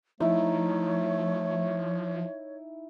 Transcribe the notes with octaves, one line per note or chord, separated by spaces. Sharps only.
F3 A3 D#4 E4 C#5